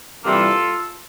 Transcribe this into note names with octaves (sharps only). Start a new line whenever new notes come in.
C3 E3 G3 A#3 D4 F4 A4